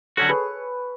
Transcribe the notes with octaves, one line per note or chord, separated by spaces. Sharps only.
D3 F#3 C#4 F#4 A4 C#5
G#4 B4